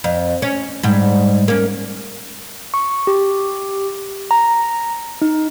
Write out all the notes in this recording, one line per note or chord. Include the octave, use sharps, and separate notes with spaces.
F2
C#4
G#2 G3
A#3 C#4
C#6
G4
A#5
D#4